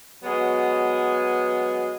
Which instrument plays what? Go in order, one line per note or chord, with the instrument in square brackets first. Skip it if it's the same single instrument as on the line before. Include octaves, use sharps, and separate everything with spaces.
[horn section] F#3 G#3 B3